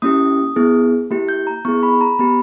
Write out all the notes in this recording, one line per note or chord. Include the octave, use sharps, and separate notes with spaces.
A#3 C#4 E4 G4 D#6
B3 E4 G#4
A#3 E4 G4
G6
A#5
B3 E4 G#4 C#6
B5
A#5
B3 G4 B5